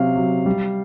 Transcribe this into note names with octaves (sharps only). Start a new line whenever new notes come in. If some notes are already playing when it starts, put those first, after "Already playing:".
Already playing: C3 F#3 F5
F#3
G3